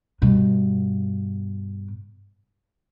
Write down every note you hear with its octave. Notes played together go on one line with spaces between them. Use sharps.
G2 B2